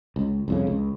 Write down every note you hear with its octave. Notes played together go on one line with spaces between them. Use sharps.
C#2
C2 F2 C#3
C#2